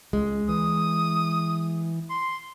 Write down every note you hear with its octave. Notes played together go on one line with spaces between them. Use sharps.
C#2 G#3
E3 D#6
C6